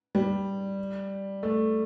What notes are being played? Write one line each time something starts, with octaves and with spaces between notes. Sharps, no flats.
G3
A3